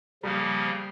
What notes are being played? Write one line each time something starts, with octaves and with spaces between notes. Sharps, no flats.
C#3 F3 G3 A#3